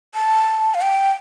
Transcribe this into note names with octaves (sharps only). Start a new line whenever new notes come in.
A5
F5
G5